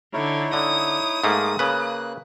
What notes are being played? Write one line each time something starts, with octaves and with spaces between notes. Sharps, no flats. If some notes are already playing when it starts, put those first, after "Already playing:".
D3 D#4 E4 C#5
D3 D#6
G#2 A3 A#3 F5
C#3 A#3 B4 F#6